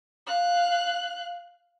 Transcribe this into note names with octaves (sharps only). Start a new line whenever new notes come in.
F5 F#6